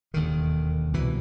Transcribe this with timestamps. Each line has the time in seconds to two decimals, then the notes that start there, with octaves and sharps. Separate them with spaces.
0.14 E1 D#2 D3 D#3
0.94 C2 B2 E3